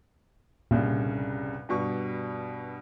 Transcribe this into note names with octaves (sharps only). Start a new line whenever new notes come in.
C2 G2 A#2 C#3
G2 B2 C#6